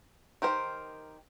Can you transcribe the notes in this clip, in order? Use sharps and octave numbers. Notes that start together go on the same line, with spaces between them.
D#3 G4 A#4 C5